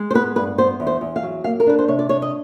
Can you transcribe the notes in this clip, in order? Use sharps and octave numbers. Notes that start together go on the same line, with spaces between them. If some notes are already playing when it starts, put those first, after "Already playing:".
Already playing: G#3
C5
B3 B4
G2 B4
B3 C5
E2
C5
E2
F5
F#3
A#3 F5
A#4
D4 B4
C5
C3 C#5
D5
D4 C#5
D#5